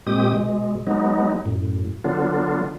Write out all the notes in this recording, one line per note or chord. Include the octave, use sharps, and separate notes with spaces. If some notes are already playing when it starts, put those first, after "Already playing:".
A#2 G#3 C4 G4 D#6
B2 G#3
F#3 G#3 B3 D#4
F#2 A2
D3 F#3 B3 D4 F4